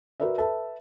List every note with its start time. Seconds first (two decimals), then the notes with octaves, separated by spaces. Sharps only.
0.20 F#4 A#4 B4 D5 E5
0.38 A4 B4 E5 A5